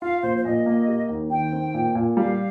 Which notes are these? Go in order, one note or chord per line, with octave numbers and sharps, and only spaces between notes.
F4 F5
A#1 C5
C5
A#2 D#5
A#3
G4
D#2
D#3 G5
C4
A#2
A#2
G3 F5